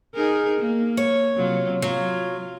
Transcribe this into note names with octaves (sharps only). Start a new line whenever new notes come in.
D#4 G#4 A#4
A#3
C#5
C3 F#3 F4
F#3 F4